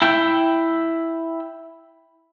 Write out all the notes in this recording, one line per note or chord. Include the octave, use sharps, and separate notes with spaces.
E4 G5